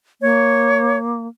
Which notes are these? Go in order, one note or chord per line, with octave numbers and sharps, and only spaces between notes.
A#3 C#5